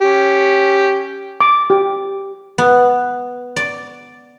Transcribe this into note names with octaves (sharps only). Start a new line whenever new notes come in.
C#4 G4
D6
G4
B3
D5